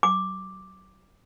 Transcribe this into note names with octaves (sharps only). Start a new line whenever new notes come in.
D6